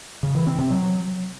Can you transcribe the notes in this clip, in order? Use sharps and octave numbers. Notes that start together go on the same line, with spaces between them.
C#3
E3
C4
C3
F#3